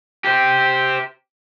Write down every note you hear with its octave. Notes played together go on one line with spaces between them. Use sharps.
G4 C5